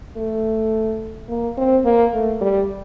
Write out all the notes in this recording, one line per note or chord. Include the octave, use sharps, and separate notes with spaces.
A3
A#3
C4
A#3
A3
G3